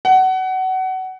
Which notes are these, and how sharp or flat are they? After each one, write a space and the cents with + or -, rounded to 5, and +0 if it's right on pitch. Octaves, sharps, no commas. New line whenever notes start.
F#5 +25